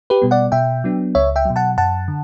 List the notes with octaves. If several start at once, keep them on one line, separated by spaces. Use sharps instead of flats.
G4 B4
B2 G3 B3
D5 F#5
B2 E5 G5
F#3 B3 D4
C#2 C#5 E5
E5 G5
B2 F#3
F#5 A5
F#2 F#5 A5
D3